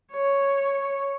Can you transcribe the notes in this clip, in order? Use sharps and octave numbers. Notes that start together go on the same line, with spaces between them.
C#5